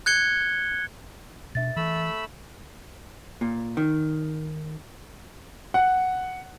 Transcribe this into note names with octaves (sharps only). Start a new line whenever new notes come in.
F#6 G#6 C#7 G7
B2 D4 E5 A6
E3 A3 B5 E6
A#2
D#3
F#5